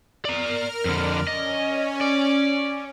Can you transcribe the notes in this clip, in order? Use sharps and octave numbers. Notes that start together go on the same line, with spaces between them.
A#4 D5 A#5 F6
F2 D3 D5
C#4 D#5
D5